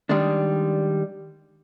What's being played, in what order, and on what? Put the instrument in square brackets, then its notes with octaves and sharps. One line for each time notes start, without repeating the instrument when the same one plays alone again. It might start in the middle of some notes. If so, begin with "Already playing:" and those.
[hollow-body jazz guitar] D#3 G3 G#3 D4